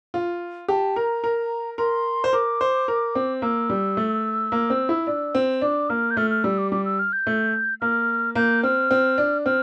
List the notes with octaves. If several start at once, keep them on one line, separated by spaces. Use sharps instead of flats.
F4
G4 A5
A#4 A#5
A#4
A#4 C6
C5
A#4 D6
C5
A#4
C4
A#3 E6
G3
A3
A#3
C4
E4
D4
C4
D4 D6
A#3 F6
G6
A3 F6
F6
G3 E6
D6
G3 D6
E6
F6
G6
A3
A#3 F6
A#3 G6
C4 F6
C4
D4
C4 F6